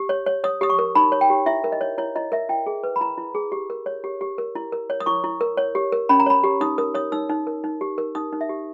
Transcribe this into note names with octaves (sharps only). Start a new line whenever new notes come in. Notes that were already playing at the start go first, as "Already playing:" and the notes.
Already playing: G4
C#5
C#5
C#5 D#6
G4 D#6
C#6
A#4
D#4 B5
C#5
G5
G4
E4 E5
A#4
D#5
C#5
E4 C#5
E4 D#5
A#4 E5
E4 G5
G#4
B4
B5
E4 A#5
E4
G#4
G4
A#4
C#5
G4
G4
A#4
E4
A#4
C#5
D#6
E4 C#6
E4
A#4
C#5
G4
A#4
C#4 B5
A#5
C#5 B5
G4
D#4 D#6
A#4 D#6
C#5 D#6
D#4 E6
D#4
A#4
D#4
G4
A#4
D#4 D#6
D#4
E5
G4